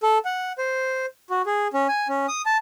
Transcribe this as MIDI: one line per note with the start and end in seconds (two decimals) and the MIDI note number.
0.03 0.18 69
0.25 0.53 78
0.58 1.06 72
1.30 1.42 66
1.46 1.68 68
1.74 1.87 61
1.89 2.08 80
2.09 2.26 61
2.28 2.42 87
2.46 2.57 81